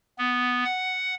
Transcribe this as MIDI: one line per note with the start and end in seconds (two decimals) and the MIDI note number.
0.18 0.64 59
0.65 1.15 78